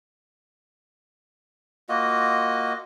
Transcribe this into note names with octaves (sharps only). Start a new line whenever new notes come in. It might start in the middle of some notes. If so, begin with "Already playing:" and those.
A#3 F4 F#4 D#5